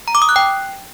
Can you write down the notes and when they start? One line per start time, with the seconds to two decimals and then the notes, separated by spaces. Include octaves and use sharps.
0.08 A#5
0.15 D6
0.22 D#6
0.29 F#6
0.36 G5